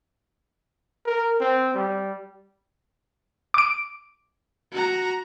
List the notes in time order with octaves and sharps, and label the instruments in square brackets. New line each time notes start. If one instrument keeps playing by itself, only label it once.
[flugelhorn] A#4
C4
G3
[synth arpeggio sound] D6 D7
[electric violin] F#4 A#5